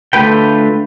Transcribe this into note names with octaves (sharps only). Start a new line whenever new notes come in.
D3 A3 F4 B4 G5